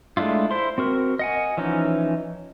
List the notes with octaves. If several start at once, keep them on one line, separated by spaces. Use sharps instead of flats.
G#3 A3 D4 E4 F4
E4 C5 C6
C4 F#4 A#4
D#5 F#5 G#5
E3 F3 C#4 D#4